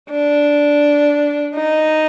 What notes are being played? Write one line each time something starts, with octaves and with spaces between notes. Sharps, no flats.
D4
D#4